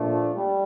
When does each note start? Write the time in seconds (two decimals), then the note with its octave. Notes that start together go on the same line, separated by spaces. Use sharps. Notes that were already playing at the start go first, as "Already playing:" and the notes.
Already playing: A#2 F3 A3 D4
0.35 G3